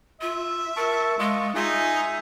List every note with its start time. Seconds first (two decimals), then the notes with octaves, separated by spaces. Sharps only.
0.22 F4 E5
0.77 A#4 A5 C#6
1.19 G#3 F4 D#5 C#6
1.55 D#4 F4 G#4 E5 G#5